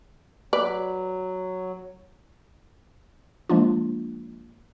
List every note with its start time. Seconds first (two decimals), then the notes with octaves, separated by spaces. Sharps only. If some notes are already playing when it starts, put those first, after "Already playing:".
0.53 F#3 B4 D5
3.49 F3 G#3 A#3 D4 F4